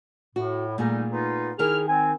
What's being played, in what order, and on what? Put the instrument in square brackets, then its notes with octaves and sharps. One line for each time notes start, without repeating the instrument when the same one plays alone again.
[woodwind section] A2 [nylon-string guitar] F#4
[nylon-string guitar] A#2 A3 G#4 [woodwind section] D3 G3 D#4
[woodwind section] B3 D#4 F4
[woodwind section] D#2 E4 F6 [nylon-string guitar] D#3 A#4 [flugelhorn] G#4
[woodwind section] C4 [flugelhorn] G#5